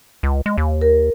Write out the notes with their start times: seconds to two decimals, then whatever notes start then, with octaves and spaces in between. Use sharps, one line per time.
0.23 C#2
0.46 G#3
0.58 D#2
0.81 A#4